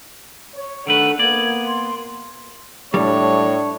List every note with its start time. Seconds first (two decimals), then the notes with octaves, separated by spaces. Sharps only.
0.55 C#5
0.87 D#3 A3 D4 A4 B4 F#5
1.19 A#3 B3 D5 G#6
1.66 C6
2.94 A2 G3 D4 C#5